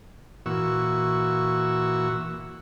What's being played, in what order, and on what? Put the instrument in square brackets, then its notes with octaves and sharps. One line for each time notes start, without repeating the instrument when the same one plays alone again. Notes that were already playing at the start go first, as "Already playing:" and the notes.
[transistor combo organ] A#2 E3 F#4 C#6 E6